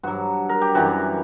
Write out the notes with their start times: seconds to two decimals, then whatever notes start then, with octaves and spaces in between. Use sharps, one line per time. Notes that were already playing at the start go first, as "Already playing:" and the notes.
0.03 G2 F#3 F#4
0.49 A#4
0.62 G4
0.75 F#2 E3 G3 F#4